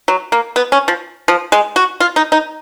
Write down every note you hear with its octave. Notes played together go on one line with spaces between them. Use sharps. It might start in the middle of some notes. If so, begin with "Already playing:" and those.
F#3
A#3
B3
C#4
F3
F3
G#3
F#4
F4
D#4
D#4